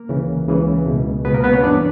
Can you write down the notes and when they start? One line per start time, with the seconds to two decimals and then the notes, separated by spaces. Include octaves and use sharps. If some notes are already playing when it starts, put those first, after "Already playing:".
Already playing: A#3 A#4
0.09 C#2 C#3 E3
0.48 C#2 C#3 E3
0.86 C#2 B2
1.25 C#2 B2 B3 B4
1.34 A#3 A#4
1.44 B3 B4
1.53 C#4 C#5
1.63 G2 E3 D4 D5